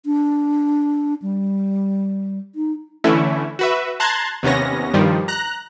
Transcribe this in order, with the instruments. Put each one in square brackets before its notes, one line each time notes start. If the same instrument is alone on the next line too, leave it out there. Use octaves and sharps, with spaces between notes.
[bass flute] D4
G3
D#4
[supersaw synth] D3 E3 A3 C#4 E4
F#4 B4 E5
A5 A#5 C6 F#6 G#6 A6
D#2 C3 B3 C#4 A#6
G2 D#3 F3 G3
A#5 F#6